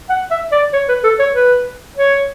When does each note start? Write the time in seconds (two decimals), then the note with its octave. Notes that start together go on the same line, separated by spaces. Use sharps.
0.10 F#5
0.31 E5
0.52 D5
0.73 C#5
0.89 B4
1.04 A4
1.19 C#5
1.34 B4
1.96 C#5